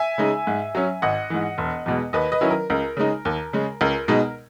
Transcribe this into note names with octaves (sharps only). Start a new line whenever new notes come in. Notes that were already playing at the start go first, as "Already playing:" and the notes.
Already playing: E5 G#5
C#3 G#3 D#4
G#2
F#3 C#4
G#1 D#5 F#5
G#2 E3
E1
E2 B2 G#3
D#2 B4 D#5
B4 D#5
D#3 F#3 C#4 E4
A#4
C#2 A#4
C#3 G#3 D#4
D#2
C#3 G#3
C#2 A#4
B2 G#3 D#4